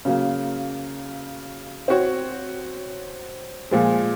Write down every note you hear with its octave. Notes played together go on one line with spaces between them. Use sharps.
C#3 F#3 A#3
C4 F#4 C#5
A#2 F3 G#3